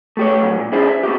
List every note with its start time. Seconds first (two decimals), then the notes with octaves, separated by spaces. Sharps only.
0.17 A3 G4 C#5
0.42 A2 F#3
0.58 A#2
0.72 C#4 D4 E4 G#4 C5 D5
0.86 E5
1.03 A#3 F#4 G4